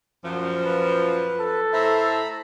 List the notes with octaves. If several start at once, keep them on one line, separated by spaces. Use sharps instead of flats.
F#2 A#2 F3
B4
A4
A2 C5 E5 A#5 B5